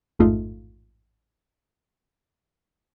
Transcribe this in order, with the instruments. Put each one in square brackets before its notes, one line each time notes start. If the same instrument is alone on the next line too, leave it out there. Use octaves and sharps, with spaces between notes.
[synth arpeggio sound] A1 F2 G#2 A3 D#4 F4